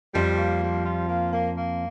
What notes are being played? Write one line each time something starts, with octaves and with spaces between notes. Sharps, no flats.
F2 F3 G3
A#3
G3
F4
A#3
A#3
A#3